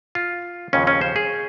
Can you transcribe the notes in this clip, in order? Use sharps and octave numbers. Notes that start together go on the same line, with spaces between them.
F4
D#2 C#3 F3 C#4
C#4
C5
G#4